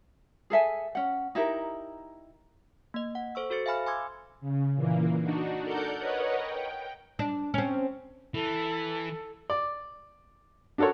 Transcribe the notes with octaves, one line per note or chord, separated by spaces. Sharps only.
G#4 A4 E5 G#5
C#4 F#5
D#4 E4 G4 A#4
A#3 D#5
F#5
A4 C5 C#6 E6
F#4 A4 C5 A6 C#7
E5 F5 G#5 B5 F6
G#5 C6 D6 E6 G#6
C#3
A#2 E3 A#3
D4 D#4 F#4
A4 A#4 D5 F#5 G6
A#4 B4 C#5 D#5 F#5
G5
D4
C4 C#4
E3 A4
D5
D4 F#4 A4 A#4 C#5